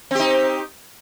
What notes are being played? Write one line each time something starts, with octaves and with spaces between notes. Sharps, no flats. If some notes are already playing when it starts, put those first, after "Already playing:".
C4 D#4 G4